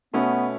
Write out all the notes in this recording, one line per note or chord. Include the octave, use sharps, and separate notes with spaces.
B2 A3 B3 C#4 F#4